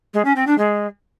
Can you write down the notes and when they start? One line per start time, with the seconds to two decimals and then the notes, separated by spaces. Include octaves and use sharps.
0.13 G#3
0.25 C#4
0.36 C4
0.47 D4
0.58 G#3